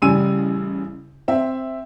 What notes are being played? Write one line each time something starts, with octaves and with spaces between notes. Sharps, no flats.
A1 C#3 G3 G#5 E6 D#7
C4 E5